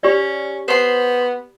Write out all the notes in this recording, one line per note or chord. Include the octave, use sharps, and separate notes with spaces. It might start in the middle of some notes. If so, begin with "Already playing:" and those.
C#4 G4 D5
B3 C5 C6